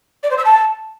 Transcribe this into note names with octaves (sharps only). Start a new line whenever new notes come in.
D5
C5
E6
A5